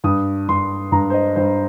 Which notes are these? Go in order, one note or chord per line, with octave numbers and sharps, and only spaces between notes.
G2 D#6
G2 C6
G2 A#5
C5
D#5
G2 C5